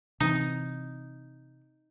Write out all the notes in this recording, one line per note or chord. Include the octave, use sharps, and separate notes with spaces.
C3 E3 C4 D#4